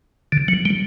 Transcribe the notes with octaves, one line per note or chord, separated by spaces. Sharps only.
D3
F#3
G3